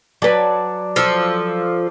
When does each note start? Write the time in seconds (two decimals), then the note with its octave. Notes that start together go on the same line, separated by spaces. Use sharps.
0.22 F#3 B4 D5 A5
0.96 F3 A4